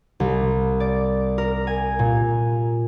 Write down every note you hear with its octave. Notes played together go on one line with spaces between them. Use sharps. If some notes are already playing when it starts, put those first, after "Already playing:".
C2
D5
A#4
G#5
A#2